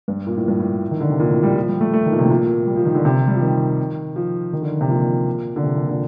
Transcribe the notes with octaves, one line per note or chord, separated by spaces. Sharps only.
G2
A#2
A2
G2
A2
D#3
D3
C3
A#2
A2
G3
F3
G3
A3
A3
D#3
A#2
C3
A2
A#2
G3
F3
D#3
D3
C3
G3
F3
D#3
F3
D#3
D3
C3
A#2
D3
C3
A#2
D3